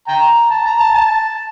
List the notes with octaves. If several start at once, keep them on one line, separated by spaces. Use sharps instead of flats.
G5 A#5
A5
A#5
A5
A5